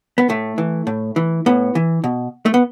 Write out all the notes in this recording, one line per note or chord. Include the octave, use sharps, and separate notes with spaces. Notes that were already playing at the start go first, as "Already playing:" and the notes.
B3
A2 A3
E3
A2
E3
A2 B3
E3
B2
A3
B3